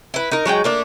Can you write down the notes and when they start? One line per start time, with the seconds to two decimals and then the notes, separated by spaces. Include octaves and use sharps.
0.14 E4 B4
0.31 D#4 A#4
0.46 F#3 G#3 D#4 G5
0.64 A3 A#3 D4